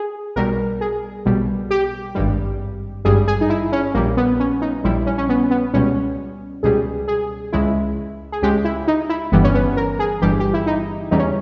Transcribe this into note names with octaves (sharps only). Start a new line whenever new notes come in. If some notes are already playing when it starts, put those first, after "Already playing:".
Already playing: G#4
B1 B2 G3 A#4
G#4
B1 B2 G3
G4
G#1 G2 G3
G#1 G2 G3 G#4
G#4
D#4
E4
C#4
A#1 A#2 G3 A#3
B3
C#4
D#4
A#1 A#2 G3 E4
C#4
C#4
B3
B3
C#2 B2 G3 C#4
C#2 B2 G3 G#4
G#4
C#2 C#3 G#3 E4
G#4
C#2 C#3 G#3 G4
E4
D#4
E4
G1 G2 E3 G3 B3
C#4
B3
A#4
G#4
G1 G2 E3 G3 G4
G4
E4
D#4
E2 C#3 E3 G3 D#4
C#4